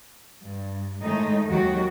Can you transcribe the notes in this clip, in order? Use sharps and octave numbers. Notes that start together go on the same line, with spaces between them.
G2
A2 D#3 G#3 A3 D#4
D#2 D#3 F#3 F#4 G4